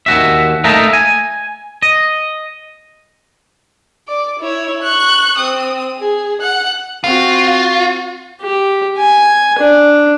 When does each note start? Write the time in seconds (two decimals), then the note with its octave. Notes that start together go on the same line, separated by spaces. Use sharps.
0.06 D#2 F#4 E5
0.64 A3 A#3 D#4 A4 A#4 E5
0.93 G#5
1.82 D#5
4.08 D5 D6
4.40 E4 C#5
4.82 C#6 F#6
5.38 C4 D#6
5.99 G#4
6.41 F#5 F#6
7.04 C4 F4 F#4
8.42 G4
8.99 G#5
9.59 D4